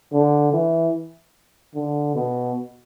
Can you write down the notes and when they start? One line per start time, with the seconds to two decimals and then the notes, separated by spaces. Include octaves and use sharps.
0.13 D3
0.53 E3
1.75 D3
2.15 B2